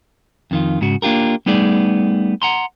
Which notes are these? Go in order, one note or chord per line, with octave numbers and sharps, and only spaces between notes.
F2 D#3 F4
G#2 C#3 F#4
A#3 D4 F4 G4 A#4
G3 A3 B3 D#4 G#4 D5
F#5 A#5 C6